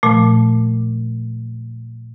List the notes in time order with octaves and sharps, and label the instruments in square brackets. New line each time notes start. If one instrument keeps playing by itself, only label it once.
[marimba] A#2 F3 A3